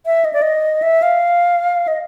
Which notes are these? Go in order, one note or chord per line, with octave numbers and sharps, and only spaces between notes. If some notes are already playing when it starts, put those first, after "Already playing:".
E5
D#5
D5
D#5
E5
F5
D#5